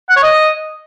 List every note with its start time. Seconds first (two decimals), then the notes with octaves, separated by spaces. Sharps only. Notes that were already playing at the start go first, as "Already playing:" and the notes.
0.09 F#5
0.16 C#5
0.23 D#5